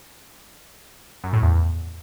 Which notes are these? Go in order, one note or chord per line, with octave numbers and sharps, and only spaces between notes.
F#2
A2
E2